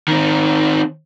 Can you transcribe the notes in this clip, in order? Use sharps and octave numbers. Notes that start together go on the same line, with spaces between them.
D#3 C4